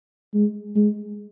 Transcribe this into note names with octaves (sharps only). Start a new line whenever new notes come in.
G#3
G#3